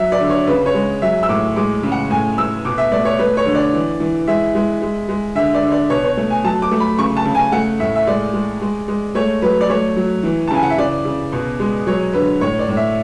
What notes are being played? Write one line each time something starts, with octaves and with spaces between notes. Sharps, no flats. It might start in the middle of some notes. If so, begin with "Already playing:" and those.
Already playing: F#3 E5
D5
D3
C#5
C#3 B4
C#5
G#3
F#3 E5
E6
A2 D6
G#3 D6
C#3
F#5
A2 G#5
A3 E6
B2 D6
E5
A3 D5
C#5
A3 B4
C#5
D3
D5
E3
E3
G#3 E5
G#3
G#3
G#3
D3 E5
D5
D3
D5
B2 C#5
C#5
A3
G#5
F#3 A5
D6
A3
B5
C#3 C#6
A5
C#3
G#5
A3 F#5
A2 E5
E5
G#3 D5
G#3
G#3
G#3
A3 C#5
F#3 B4
D5
A3 C#5
F#3
E3
A5
C#3 G#5
F#5
E5
C#3 D5
C#3
B2
G#3
F#3 C#5
D3 B4
A2 C#5
D5
A2
E5